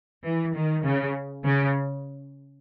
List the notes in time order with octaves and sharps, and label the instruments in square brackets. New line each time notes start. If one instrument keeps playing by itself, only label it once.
[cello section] E3
D#3
C#3
C#3